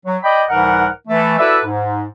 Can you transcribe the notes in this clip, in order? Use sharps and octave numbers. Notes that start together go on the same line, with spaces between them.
F#3
D5 D#5 G5 B5
C2 G#2 E3 A#4 F#5
E3 A3
E4 F#4 A4 B4 D5 E5
G#2